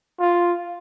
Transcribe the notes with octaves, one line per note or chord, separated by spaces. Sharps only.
F4